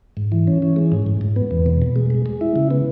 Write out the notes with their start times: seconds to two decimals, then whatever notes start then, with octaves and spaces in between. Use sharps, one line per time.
0.17 G#2
0.32 E3
0.47 C#4
0.62 E3
0.76 G#3
0.92 G#2
1.06 G#2
1.21 G#2
1.36 B3
1.51 E2
1.66 B2
1.82 B2
1.96 G#3
2.10 G#3
2.26 G#3
2.41 E4
2.56 C#3
2.71 B3